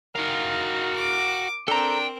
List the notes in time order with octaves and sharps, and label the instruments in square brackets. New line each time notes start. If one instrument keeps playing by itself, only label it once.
[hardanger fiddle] D#4 [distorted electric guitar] F#4 F5 [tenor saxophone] A#4
[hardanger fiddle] D6
[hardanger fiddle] C4 A#4 [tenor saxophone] D4 [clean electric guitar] A4 A#5 [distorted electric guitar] G5